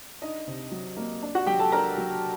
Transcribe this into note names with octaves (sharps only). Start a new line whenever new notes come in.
D4 D#4 D#5
C3
F#3
A#3
D4
F#4 F#5
F#3 G4 G5
A4 A5
D4 A#4 A#5
F#3